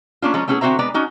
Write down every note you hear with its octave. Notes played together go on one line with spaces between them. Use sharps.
A#3 C#4 D4 F4
F3 G#3 C#4 C#5 A#5
A3 B3 C#4 E4 G#4
D3 C4 F#4 C5 E5 A#5
G#3 B3 B4 D5 A#5
C#4 D#4 F#4